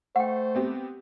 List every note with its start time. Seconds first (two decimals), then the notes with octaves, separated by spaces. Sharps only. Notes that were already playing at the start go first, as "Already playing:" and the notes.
0.16 A3 C5 F#5 G5 C#6
0.55 B3 C4 G4